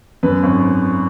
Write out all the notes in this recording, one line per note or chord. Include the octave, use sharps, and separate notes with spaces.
F#2 B4
G#1